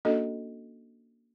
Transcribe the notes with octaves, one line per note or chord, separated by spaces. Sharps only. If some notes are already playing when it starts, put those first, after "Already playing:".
A#3 C#4 D4 F#4 A4 D#5